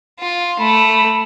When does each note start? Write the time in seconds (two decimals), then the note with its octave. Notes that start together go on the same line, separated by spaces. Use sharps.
0.20 F4
0.59 A3 B5